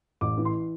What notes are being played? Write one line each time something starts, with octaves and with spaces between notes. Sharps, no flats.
A1 D6
E3
C6